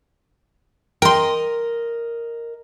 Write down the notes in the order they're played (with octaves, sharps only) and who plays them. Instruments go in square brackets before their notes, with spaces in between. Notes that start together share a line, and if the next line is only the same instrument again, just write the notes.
[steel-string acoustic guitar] A#4 D#5 [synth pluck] G5 C6